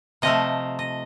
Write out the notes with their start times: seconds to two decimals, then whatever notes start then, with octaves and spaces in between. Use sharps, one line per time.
0.22 C3 F3 A3 D#5
0.79 D#5